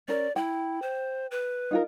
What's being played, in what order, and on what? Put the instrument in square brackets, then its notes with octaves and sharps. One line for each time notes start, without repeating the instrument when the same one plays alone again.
[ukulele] C#4 A#4 [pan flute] D5
[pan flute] E4 [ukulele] G5
[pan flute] C5
B4
[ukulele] D#4 F4 A#4